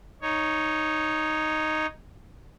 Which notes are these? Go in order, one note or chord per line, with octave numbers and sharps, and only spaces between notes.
D#4 C#5